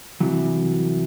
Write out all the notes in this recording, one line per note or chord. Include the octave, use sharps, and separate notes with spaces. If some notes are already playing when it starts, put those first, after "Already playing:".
C2 C3 E3 F#3